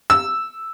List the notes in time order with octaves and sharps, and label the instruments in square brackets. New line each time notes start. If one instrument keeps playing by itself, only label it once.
[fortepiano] E6